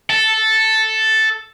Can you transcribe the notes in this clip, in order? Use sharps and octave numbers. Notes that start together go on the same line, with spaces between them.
A4